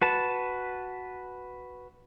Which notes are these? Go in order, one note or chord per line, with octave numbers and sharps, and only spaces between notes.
F#4 B4 A5